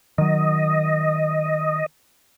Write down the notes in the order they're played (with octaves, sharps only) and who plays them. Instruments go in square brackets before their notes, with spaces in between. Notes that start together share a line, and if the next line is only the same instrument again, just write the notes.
[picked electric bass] D#3 F#3 [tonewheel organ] D#5